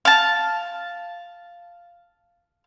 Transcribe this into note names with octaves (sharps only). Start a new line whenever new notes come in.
F5 A5